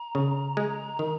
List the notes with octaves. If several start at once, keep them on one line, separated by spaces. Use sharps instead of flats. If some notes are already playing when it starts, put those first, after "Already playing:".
Already playing: A#5
C#3
G#3
D#3